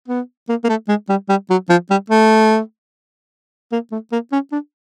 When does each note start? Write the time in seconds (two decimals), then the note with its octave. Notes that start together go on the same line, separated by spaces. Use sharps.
0.08 B3
0.49 A#3
0.64 A#3
0.69 A3
0.89 G#3
1.09 G3
1.29 G3
1.50 F#3
1.69 F3
1.90 G3
2.10 A3
3.72 A#3
3.92 A3
4.12 A#3
4.32 C#4
4.52 D4